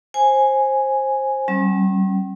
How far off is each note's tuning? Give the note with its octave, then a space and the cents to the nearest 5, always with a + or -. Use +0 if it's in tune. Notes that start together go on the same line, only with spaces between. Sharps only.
C5 +20 G#5 +0
G3 -35 C#4 -45